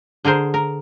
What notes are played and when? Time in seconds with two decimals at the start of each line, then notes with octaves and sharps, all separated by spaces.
0.24 D3 G#4 A#4 C5
0.54 A#4